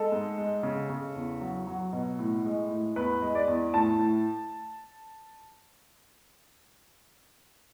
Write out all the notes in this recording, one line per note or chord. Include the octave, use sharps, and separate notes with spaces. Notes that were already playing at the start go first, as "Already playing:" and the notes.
Already playing: G#3 A4
G#2
G#3
C#3
C#3
E2
F#3
F#3
B2
A2
G#3
A2
E2 B4
G#3
D5
E2
A2 A5
A2